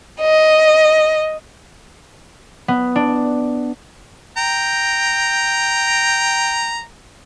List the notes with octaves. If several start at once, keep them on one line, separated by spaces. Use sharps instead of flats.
D#5
B3
D4
G5 A#5